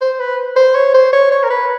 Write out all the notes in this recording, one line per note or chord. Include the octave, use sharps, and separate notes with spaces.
C5
B4
C5
C#5
C5
C#5
C#5
A#4
B4